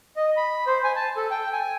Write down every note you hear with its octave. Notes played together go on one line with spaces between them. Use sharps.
D#5
B5
C5
G#5
A5
A4
G5
G#5